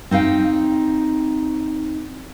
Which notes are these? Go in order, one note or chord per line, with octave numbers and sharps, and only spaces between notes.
C4 D#4 F5 G5